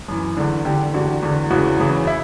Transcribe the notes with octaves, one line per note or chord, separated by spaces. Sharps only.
F#2 E3
E2 D3
E2 D3 G4
E2 D3 F#4
E2 D3
E2 C#3 E3 F#4
E2 C#3 E3
E4